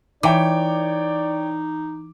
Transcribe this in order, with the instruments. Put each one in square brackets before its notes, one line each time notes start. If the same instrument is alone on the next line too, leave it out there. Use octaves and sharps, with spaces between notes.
[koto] E3 [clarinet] D#4 [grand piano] C#5 G5 D6 [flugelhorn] D5